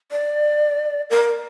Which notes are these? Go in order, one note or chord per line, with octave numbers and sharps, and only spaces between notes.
D5
A#4